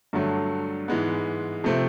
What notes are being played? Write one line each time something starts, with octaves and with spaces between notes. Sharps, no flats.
G2 D3 F#3 A3
G#2 E3 G#3 B3
C3 F3 A3 C4